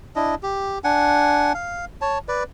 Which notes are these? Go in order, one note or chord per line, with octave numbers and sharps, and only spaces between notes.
D4 E4 D#5
G4
D4 F#5 G#5
F5
C#5 A5
B4 D5